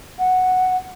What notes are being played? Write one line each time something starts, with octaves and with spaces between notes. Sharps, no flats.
F#5